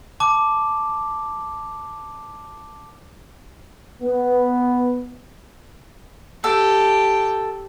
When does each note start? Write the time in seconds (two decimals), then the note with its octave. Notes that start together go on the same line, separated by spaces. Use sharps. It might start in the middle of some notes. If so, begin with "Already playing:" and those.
0.20 A5 D6
4.02 B3
6.44 G4 A4 G5